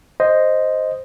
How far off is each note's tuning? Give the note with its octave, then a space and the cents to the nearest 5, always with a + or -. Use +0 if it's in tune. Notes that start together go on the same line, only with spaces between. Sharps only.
C5 +0 D#5 +0